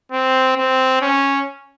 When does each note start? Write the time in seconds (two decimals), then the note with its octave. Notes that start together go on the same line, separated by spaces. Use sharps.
0.12 C4
0.57 C4
1.01 C#4